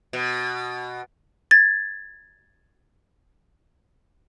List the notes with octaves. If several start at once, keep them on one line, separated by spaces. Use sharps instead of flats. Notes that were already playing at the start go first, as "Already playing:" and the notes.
B2
G#6 A6